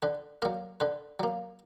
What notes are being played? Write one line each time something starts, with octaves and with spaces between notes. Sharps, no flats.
D3 B4
F#3 A#3 A#4
D3 B4
F#3 A#3